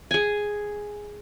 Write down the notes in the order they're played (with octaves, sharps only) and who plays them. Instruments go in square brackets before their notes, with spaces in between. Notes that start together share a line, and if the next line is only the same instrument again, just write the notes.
[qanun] G#4 G#5